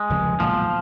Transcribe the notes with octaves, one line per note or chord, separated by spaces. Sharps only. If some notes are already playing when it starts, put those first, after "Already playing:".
Already playing: G#3
F1 D#2 C#3 F3
B1 A#2 F3 G#3